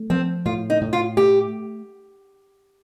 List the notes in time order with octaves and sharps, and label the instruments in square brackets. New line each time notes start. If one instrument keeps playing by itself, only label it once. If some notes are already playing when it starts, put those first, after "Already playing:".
Already playing: [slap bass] A3
[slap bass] F3 [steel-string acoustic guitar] C4
[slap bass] A2 [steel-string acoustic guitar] F4
[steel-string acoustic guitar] D#4
[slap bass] A2
[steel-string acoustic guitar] F4
[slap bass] A3 [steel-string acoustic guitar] G4